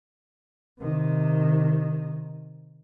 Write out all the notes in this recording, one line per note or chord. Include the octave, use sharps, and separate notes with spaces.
C3 D#3